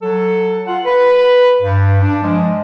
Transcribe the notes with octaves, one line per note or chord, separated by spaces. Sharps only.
F#3 A4
F4 F#5
B4
G2
D4
F3 G#3